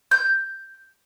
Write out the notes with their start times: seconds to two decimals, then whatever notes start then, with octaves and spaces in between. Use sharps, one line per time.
0.11 G6